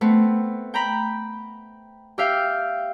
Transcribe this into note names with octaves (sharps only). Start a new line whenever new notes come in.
A3 B3 C4
G5 A#5 B5
G4 E5 F5 G5